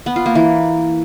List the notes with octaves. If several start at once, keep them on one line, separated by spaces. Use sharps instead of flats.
B3
F4
A#3
E3